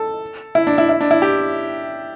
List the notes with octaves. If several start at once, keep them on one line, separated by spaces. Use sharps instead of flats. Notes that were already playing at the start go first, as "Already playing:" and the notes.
Already playing: A4
E4
D4
E4
E4
D4
E4
G4